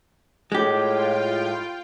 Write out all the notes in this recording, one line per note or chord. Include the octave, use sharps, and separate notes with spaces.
A2 G#3 F4 G4 G5